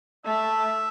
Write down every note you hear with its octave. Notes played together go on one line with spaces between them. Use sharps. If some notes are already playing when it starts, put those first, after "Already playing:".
A3 E5